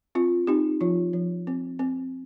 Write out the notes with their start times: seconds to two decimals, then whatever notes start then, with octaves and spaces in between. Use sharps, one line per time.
0.15 C4 F4
0.47 C4 D#4 G4
0.81 F3 F4
1.13 F3
1.47 C4
1.79 C4